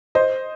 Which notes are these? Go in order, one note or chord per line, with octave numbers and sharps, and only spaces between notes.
C5 D#5